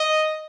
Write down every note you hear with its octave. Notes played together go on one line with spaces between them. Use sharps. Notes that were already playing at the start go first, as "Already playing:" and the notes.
Already playing: D#5